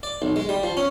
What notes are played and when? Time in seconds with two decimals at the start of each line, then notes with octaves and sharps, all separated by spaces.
0.03 D5
0.22 B1
0.36 G#3
0.49 G3
0.63 F3
0.77 C#4